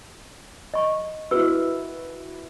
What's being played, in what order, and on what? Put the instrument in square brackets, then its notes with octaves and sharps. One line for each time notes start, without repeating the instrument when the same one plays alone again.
[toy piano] D#5 C#6
[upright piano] E4 F#4 [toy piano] A#4 B4 E6